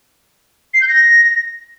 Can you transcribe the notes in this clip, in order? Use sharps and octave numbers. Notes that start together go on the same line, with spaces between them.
C7
G6
A#6